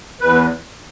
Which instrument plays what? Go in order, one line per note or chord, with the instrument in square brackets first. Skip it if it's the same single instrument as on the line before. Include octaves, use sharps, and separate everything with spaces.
[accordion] E2 B4